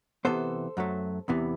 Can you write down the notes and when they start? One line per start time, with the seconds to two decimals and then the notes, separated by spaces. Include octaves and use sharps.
0.25 C3 E3 B3 A4 C5
0.77 F#2 F#3 A3
1.28 E2 C3 E3 B3